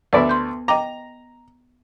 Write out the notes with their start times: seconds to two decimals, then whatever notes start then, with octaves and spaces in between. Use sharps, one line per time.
0.13 D2 B3 A4 B4 D5 E5
0.29 C6 G6
0.68 D#5 G5 A#5 D6